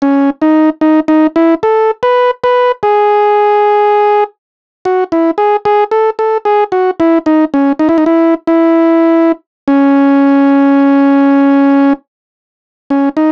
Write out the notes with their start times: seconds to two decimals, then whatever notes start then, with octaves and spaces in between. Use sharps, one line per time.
0.02 C#4
0.42 D#4
0.81 D#4
1.08 D#4
1.36 E4
1.63 A4
2.03 B4
2.44 B4
2.83 G#4
4.85 F#4
5.12 E4
5.38 G#4
5.65 G#4
5.91 A4
6.19 A4
6.45 G#4
6.72 F#4
7.00 E4
7.26 D#4
7.54 C#4
7.79 D#4
7.89 E4
7.98 D#4
8.06 E4
8.47 E4
9.68 C#4
12.90 C#4
13.17 D#4